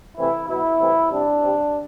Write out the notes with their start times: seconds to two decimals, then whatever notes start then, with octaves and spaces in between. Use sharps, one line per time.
0.16 C3 E3 A3 C4 E4
0.47 B2 F#3 B3 E4
0.79 A2 E3 G3 C4
1.10 C3 G3 C4 D4
1.41 C3 G3 C4